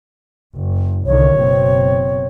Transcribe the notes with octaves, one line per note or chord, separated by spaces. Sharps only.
F#1
C2 D3 D#3 C#5
F#1 B2 C4